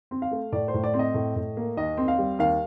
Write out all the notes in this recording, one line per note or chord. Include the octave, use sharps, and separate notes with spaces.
C4
F5
A3
A2 D5
C5
A2
D5
C4
D#5
A2
A2
A#3
D#2 D#5
C4
F5
G3
D#2 F5